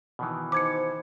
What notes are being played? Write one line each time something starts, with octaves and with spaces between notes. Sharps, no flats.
B2 D#3 E3
D#4 C5 D6 G#6 C#7